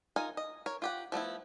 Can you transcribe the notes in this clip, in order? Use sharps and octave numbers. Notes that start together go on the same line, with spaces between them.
D#4 F4 A#4 G#5
D#5
A#4 C#5
F4 G4 F#5
F3 A3 B3 E4